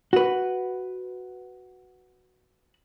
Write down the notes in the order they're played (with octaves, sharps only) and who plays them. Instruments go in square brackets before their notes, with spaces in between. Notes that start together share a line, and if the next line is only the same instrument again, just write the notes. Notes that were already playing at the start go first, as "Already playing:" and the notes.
[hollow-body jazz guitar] F#4 B4